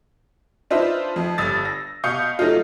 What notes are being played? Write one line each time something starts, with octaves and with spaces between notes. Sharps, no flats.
D4 D#4 F4 B4 C5 E5
F2
G1 G2 D#6 E6 A6
A#6
B2 F5 C#6 D#6 G6 C#7
F#3 A3 D#4 F4